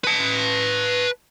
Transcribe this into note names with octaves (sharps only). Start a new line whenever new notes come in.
B4 A5